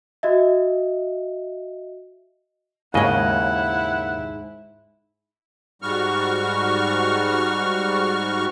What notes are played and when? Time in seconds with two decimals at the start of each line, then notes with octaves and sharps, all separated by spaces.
0.23 F#4 D#5 E5
2.94 D#2 G#2 C#3 E4 C#5 D#5 F#5
5.82 G#2 G3 F#4 C#6 F6